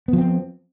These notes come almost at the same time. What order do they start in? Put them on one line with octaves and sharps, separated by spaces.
B3 F3 C4